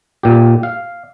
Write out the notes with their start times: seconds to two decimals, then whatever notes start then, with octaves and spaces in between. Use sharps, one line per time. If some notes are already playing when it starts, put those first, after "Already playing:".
0.23 A#2 G4
0.63 F5